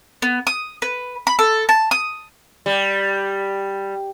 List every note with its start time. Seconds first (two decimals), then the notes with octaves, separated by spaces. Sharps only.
0.22 B3
0.47 D#6
0.82 B4
1.27 B5
1.39 A4
1.69 A5
1.91 D#6
2.66 G3